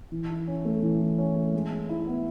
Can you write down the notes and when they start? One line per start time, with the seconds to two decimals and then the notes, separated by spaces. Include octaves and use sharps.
0.12 E3
0.30 E4
0.47 C#4
0.65 A3
0.83 E3
1.00 E4
1.18 C#4
1.36 A3
1.53 G#3
1.71 G#3
1.89 E4
2.07 B3